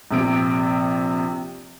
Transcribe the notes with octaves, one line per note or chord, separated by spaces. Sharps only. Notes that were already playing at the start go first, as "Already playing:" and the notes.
A#1 C3 D7